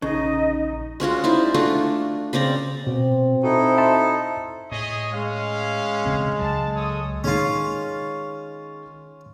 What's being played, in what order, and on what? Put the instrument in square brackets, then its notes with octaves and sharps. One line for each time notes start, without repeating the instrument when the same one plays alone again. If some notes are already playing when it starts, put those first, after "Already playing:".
[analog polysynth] A#1 D#4 [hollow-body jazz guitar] C#3 [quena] D#5
[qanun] G#3 C#4 F4 F#4
D#4 E4 C5 D5
A3 D4 F4 F#4
C#3 C4 D5 A#5
[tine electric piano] B2 [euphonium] C4
[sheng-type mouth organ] D#4 E4 A4 [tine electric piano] F#4
[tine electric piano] E5 A5 C6
[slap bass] A2 [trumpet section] G#4 C#5 D#5
[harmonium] G#3 [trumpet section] C#4 F5
[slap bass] E1 C#3 C4
[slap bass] C#2 F#3 [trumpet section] A5
[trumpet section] A4 C#5 D#6
[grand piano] D#3 G#3 [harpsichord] C#4 F4